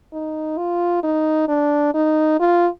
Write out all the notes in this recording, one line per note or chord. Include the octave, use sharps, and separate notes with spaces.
D#4
F4
D#4
D4
D#4
F4